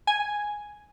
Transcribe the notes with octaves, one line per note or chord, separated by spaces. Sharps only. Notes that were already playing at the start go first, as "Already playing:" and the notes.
G#5